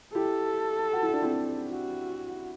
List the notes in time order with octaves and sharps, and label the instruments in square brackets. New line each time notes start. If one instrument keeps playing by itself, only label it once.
[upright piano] E4 G4 [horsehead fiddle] A4
[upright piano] F#4
E4
D4
C4 E4
[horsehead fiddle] F#4